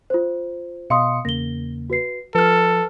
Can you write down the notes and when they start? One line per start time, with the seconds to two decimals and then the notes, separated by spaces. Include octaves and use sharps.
0.10 F4 C5
0.90 B2 D#5 F5 C6 D#6 C#7
1.25 E2 C#3 A#3 A#6 G7
1.90 F#4 B4 C7
2.35 F3 A4 B4 F6